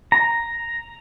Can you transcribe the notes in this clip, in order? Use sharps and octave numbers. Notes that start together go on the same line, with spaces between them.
A#5